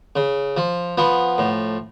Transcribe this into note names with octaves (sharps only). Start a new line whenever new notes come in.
C#3
F3
F3 B3
A2